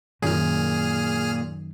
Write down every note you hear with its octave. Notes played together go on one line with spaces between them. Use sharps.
F#2 A#2 D#3 G#4 F6